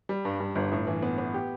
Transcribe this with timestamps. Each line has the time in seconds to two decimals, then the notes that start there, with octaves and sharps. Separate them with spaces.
0.09 G3
0.25 G2
0.40 G2
0.55 G1
0.72 A2
0.87 E3
1.02 B3
1.18 B3
1.34 G4